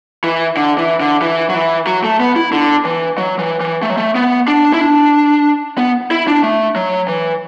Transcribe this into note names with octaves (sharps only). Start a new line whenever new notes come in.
E3
D3
E3
D3
E3
F#3
E3
F#3
A3
B3
E4
D3
E3
F#3
E3
E3
A3
F#3
A3
B3
D4
E4
D4
B3
E4
D4
A3
F#3
E3